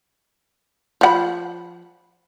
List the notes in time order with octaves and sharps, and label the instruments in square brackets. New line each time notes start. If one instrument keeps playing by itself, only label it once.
[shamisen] F3 F#5 B5